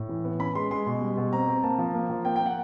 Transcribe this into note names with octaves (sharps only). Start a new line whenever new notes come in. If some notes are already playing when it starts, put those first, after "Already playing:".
Already playing: A2
E3
B3
C#4 B5
G#3 C6
G#3 C6
B2
G3
B2
C4 A#5
C4
A#3 A5
F3
A#3
F3
A#3 G5
G5
A#3
F#5